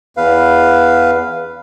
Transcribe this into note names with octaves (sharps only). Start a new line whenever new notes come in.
E2 B4 F5